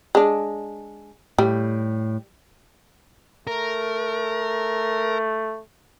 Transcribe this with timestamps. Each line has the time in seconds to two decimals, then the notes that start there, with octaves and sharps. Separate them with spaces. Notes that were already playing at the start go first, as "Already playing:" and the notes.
0.15 G#3 D4
1.38 A2 G3
3.47 A3 A#4